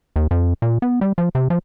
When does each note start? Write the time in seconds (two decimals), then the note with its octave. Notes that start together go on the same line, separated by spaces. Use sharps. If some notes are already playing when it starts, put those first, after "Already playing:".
0.16 D#2
0.31 F2
0.62 A#2
0.82 B3
1.01 G3
1.18 F3
1.35 C3
1.50 F3